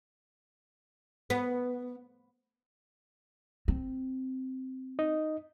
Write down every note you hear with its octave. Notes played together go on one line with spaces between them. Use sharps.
B3
C4
D#4 D#5